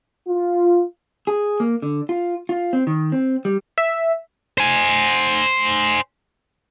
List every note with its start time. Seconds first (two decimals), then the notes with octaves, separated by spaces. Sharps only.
0.28 F4
1.27 G#4
1.60 A#3
1.82 D3
2.09 F4
2.49 F4
2.73 C4
2.87 D#3
3.12 C4
3.45 G3
3.78 E5
4.58 C5 G#5